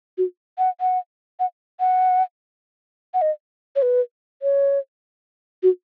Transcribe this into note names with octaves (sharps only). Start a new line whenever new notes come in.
F#4
F#5
F#5
F#5
F#5
F#5
D#5
C#5
B4
C#5
F#4